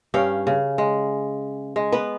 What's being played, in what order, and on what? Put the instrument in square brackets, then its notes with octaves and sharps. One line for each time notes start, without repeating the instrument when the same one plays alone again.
[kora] G2 C#4 F5 G5
C#3
G#3
G#3
B3 B4